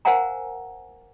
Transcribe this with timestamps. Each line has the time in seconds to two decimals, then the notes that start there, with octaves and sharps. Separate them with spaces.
0.05 A#4 C5 F5 F#5 G#5 A#5